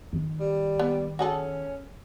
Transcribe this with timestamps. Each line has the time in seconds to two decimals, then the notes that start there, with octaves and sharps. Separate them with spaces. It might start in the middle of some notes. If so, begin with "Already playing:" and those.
0.13 D#3
0.40 G3
0.79 B3
1.19 C#4 F#4 G#4 A4